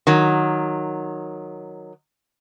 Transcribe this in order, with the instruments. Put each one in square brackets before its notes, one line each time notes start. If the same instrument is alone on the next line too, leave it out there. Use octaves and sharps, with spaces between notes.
[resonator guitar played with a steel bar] D#3 F#3